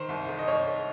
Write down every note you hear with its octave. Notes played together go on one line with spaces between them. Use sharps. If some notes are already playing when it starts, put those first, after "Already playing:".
Already playing: D#3 C5
C2
D#3
D#5
C2 C#5
D#3